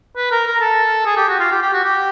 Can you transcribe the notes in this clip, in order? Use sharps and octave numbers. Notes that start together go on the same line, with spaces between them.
B4
A#4
A#4
A4
G#4
G4
F#4
F4
G4
G4
F#4
G4